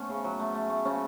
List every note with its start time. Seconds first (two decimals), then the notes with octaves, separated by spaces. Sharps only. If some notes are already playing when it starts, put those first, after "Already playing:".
Already playing: A3 B3 C#4
0.09 C#3
0.24 F#3
0.39 A3
0.55 A3
0.70 A3
0.85 C#3 C#4